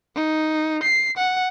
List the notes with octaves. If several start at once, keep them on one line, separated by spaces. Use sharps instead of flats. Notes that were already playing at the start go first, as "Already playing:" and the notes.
D#4
C7
F#5